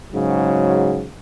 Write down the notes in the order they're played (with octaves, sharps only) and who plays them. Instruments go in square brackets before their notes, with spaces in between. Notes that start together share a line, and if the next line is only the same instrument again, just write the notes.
[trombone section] G#2 C#3 F#3